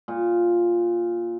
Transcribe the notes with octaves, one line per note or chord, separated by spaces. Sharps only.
A#2